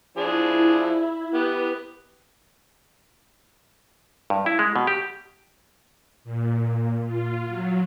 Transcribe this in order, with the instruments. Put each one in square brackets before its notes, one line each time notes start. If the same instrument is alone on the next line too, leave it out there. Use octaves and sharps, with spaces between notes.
[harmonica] F3 D4 G#4 [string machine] E4
[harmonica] B3 G4 [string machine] B4
[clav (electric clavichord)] G2
E4
G#3
B2
G4
[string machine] A#2
F4
F#3